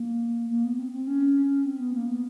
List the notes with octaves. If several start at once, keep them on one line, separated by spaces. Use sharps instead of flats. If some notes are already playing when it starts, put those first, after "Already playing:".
Already playing: A#3
A#3
B3
C4
C4
C#4
C4
B3
A#3
B3